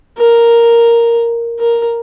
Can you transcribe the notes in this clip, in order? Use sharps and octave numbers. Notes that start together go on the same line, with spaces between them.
A#4
A#4